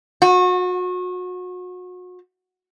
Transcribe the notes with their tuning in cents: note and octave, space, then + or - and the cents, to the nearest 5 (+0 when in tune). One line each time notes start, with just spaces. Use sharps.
F#4 -35